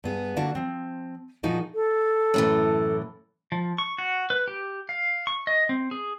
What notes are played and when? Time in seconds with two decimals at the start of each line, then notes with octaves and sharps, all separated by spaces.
0.04 G2 B3 G#4
0.36 D3 A#3 D4 F#4 A5
0.55 F3 C4
1.43 A#2 F3 D#4 F#4 G#4 A#4
1.74 A4
2.34 F#2 A2 E3
3.52 F3
3.78 C#6
3.98 F#4
4.30 B4
4.48 G4
4.89 F5
5.27 C#6
5.47 D#5
5.69 C4
5.91 G#4